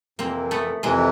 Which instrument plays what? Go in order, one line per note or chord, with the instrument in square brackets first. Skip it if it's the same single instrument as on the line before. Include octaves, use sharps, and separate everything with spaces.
[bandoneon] F2 C3 E3 [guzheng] A#3 C4
[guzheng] A3 B3
[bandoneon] F2 C3 E3 [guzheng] G#3 A#3